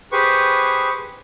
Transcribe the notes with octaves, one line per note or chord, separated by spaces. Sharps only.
G4 G#4 B4 C5 C#6